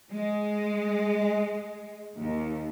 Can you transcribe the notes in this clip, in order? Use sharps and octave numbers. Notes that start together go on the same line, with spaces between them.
G#3
D#2